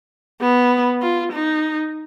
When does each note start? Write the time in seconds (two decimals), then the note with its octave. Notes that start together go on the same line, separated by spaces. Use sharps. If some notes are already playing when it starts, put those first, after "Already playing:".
0.41 B3
1.02 F4
1.33 D#4